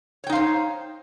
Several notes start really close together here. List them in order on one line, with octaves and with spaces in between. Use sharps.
C#5 G5 D#4 F5 C5